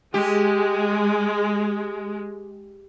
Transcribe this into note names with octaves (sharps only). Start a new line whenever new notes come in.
G#3 G4